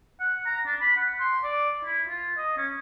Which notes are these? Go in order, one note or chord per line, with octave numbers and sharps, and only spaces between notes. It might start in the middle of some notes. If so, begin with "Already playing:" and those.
F#5
A#5
D4
B5
F#5
C6
D5
E4
F4
D#5
C#4